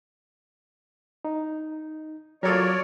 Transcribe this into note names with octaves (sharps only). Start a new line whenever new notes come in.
D#4
F#3 F4 A4 A#4 C#5 D5